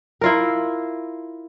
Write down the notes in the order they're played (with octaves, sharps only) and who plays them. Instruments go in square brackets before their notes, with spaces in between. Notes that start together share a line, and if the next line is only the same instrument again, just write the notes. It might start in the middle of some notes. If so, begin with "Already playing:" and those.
[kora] E4 F4 A#4